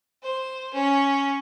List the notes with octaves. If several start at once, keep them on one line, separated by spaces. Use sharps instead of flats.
C5
C#4